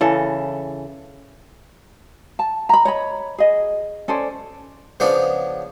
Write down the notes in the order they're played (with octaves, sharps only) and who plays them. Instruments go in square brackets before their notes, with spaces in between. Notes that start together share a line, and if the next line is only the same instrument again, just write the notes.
[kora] C#3 E3 A4
[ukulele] A5
A#5 B5
C#5 D#5 B5
G#4 D#5
C#4 A4 C5 D5
[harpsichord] C#3 F3 B3 D4